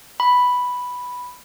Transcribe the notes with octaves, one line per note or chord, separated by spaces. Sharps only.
B5